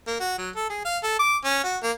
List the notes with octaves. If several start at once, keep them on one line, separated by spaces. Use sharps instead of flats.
A#3
F#4
F#3
A4
G#4
F5
A4
D6
C#4
F#4
A#3